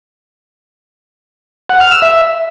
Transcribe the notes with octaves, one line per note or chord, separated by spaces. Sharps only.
F#5
F6
E6
E5